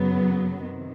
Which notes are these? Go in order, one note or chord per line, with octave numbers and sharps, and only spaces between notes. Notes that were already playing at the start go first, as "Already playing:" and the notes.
Already playing: F#2 C#3 F#3 B3
C3 D#3